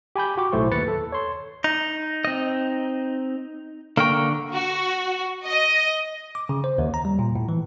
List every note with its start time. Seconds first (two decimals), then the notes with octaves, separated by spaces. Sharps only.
0.16 G4 G#5 B5 G6
0.37 F#4 G5 D6
0.52 B1 A2 A3 C5 C#6
0.71 D#2 B4 A6 C#7
0.88 A4
1.12 C#5 C6
1.64 D#4
2.25 C4 D#5
3.97 D3 A#3 A#4 G5 C#6
4.52 F#4
5.47 D#5
6.35 D6
6.49 C#3
6.64 C5
6.78 D#2
6.94 A#5
7.05 G3
7.19 A#2
7.36 A2
7.49 E3